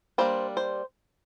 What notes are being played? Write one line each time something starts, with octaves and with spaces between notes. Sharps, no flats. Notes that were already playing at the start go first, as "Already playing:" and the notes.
G3 A#3 D4 C5
C5